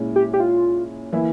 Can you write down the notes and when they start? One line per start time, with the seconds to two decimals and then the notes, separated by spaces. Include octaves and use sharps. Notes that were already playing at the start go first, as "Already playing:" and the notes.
Already playing: A#2 G#3 C#4 E4
0.16 G4
0.34 G4
0.40 F4
1.13 E3 A#3 E4